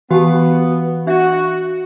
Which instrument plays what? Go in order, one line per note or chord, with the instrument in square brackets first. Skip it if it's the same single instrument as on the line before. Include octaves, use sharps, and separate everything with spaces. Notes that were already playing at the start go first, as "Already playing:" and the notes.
[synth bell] E3 F5 [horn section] B3 [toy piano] F#4 G4 A5
[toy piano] D4 E5 [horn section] F#4